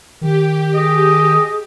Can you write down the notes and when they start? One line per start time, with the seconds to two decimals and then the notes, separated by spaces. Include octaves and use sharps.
0.21 D#3 G4
0.74 G#4 D#5